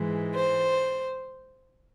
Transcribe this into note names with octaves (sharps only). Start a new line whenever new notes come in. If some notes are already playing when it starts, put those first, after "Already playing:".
Already playing: G#2 E3 G#3
C5